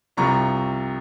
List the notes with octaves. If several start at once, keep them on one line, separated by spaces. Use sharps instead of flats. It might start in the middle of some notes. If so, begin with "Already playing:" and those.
C2 C3 F3 A#5 C#6